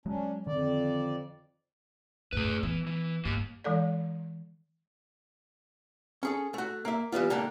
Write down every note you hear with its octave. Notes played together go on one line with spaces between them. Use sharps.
F#3 G#3 C#4 D4
F2 D3 D#3 D5
F#2 A2 G#4 B4
E3 B3
E3
G2 A#3 G4
E3 G#3 A4 D5
C#4 G#4 A4
A3 F#4
A#3 E5
E3 G3 B3 F4
G#2 D3 A#3 G4 A5